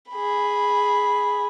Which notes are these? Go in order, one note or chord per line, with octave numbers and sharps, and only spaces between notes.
G#4 B5